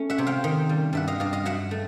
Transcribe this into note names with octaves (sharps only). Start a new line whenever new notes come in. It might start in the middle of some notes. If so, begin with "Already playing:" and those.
Already playing: A3 C#4
E5 F#5
C3
F5 G5
D#3
G3
G2 E5 F#5
D#5 F5
G2 D#5 F5
D#5 F5
F#3 E5 F#5
A3